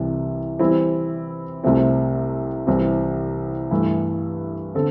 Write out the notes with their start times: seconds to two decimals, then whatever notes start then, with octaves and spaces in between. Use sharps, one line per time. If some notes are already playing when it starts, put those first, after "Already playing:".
Already playing: C2 C3 E3
0.59 E3 G3 C4 E4
1.64 C2 C3 A3 C4
2.67 C2 C3 E3 G3 C4
3.71 G2 E3 A3 E4
4.75 D3 C4 A4